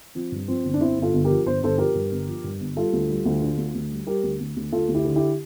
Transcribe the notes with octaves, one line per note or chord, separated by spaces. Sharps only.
F3 C4
G2
F3 C4
G1
D4
G1 C4 E4
G1
F4 A4
G1
G4 A#4
F3
G1 C5
G1 A4 C5
F3 G4 A#4
G2
G1
F3
G2
G1
G3 F4 A4
D2
G3
D2
D3
D2
D2
G3
G3 G4 A#4
D2
D2
D2
D2 F4 A4
D2
E4 G4
D3
E4 G4